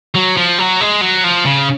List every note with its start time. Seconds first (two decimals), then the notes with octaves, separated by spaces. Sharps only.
0.15 F#3
0.37 F3
0.59 F#3
0.81 G#3
1.02 F#3
1.24 F3
1.46 C#3